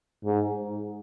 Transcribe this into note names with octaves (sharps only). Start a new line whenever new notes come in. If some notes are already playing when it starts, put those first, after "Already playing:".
G#2